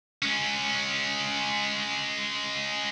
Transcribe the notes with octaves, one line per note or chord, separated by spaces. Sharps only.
G#3 C#4